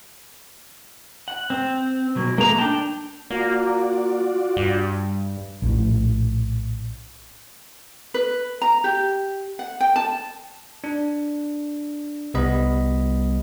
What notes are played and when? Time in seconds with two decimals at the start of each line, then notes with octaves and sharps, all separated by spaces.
1.28 F#5
1.50 C4
2.15 B2 F#3 A#3
2.38 G#3 A#3 A4 A#5
2.58 D4 G5 A5
3.31 A#3 F4 F#4 D5
4.57 G2
5.62 A#1 A2
8.14 B4
8.62 A#5
8.84 G4
9.59 F#5
9.81 G5
9.96 A5
10.84 D4
12.34 C2 G3 B3 D#5 B5